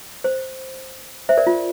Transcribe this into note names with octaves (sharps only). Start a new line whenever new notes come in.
C5
C5 E5
A#4 D5
F4